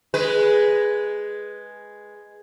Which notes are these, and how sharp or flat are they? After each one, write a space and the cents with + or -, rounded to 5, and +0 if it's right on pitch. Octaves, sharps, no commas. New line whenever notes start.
G#3 +0 B4 +0